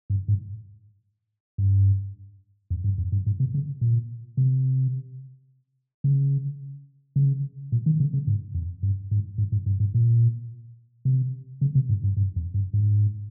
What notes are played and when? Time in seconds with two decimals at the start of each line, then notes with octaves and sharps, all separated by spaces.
0.10 G2
0.28 G#2
1.58 G2
2.70 F2
2.84 G2
2.98 F2
3.12 G2
3.26 G#2
3.40 C3
3.54 C#3
3.81 A#2
4.37 C3
6.04 C#3
7.16 C#3
7.72 A#2
7.86 D#3
8.00 C#3
8.14 C#3
8.27 G#2
8.55 F2
8.83 G2
9.11 G#2
9.38 G#2
9.52 G#2
9.66 G2
9.80 G#2
9.94 A#2
11.05 C3
11.61 C#3
11.75 C3
11.89 G#2
12.04 G2
12.17 G2
12.36 F2
12.54 G2
12.73 G#2